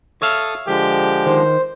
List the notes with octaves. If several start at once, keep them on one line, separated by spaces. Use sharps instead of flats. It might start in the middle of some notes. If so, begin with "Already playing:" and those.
A4 C#5 E5 F5 D#6
D3 F3 G#3 G4
D#3 C5